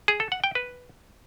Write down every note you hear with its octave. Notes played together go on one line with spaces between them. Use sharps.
G#4
A4
F#5
G5
B4